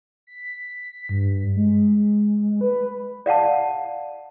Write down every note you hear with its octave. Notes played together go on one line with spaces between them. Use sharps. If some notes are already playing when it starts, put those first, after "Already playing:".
B6
G2
G#3
B4
D5 F5 F#5 A5